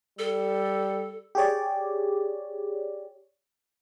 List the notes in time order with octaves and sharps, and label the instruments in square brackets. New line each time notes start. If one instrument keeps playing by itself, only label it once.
[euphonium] G3 [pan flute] A4
[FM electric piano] G4 G#4 C#5 D5